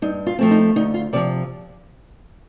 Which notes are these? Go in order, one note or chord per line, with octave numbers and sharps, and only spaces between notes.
G2 D#4
F4
F3 A3 C4
D#4
D2 D#4
F4
C3 F3 D5